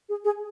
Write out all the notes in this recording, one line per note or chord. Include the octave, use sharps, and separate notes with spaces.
G#4
G#4